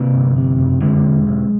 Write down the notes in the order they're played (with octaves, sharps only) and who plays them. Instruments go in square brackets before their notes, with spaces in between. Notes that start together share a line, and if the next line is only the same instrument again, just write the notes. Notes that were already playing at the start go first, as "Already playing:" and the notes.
Already playing: [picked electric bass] C3 A#3
G1
C3
F#1
D3 G#3
E1
B1